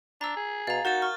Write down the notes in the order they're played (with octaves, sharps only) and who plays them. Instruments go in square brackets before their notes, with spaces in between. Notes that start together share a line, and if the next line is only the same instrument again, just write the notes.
[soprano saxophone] D4 [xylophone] A#5 E6
[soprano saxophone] G#4
[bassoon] B2 [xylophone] F5 A#5 [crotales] A6
[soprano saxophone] D#4 [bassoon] F#4 [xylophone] A#4 E7 [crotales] G6 A6
[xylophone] C#6 [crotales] F6